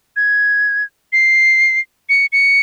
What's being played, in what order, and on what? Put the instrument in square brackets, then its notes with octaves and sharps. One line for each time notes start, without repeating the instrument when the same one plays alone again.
[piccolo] G#6
C7
C#7
C#7